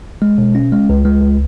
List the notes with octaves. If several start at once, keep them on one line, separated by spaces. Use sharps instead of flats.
G#3
B2
C#4
G#3
C#2
G#3
C#2